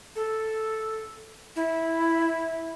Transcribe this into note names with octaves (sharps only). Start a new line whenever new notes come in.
A4
E4